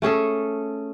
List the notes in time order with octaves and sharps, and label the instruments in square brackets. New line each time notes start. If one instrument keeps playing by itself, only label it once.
[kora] A3 C#4 G#4 A4